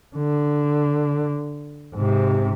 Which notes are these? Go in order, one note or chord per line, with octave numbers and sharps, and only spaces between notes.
D3
G#2 C3